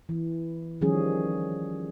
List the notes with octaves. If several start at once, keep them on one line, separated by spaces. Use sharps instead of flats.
E3
D#3 F3 G3 C#4 G#4